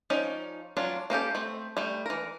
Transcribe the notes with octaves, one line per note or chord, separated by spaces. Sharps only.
F3 C#4 D#4 D5
F#3 C#4 D4 F4
A#3 C#4 G4 A4
A3 C4
G3 A3
E3 A#4